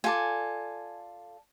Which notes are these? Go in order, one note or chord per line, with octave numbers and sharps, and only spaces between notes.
F4 A4 D5 G#5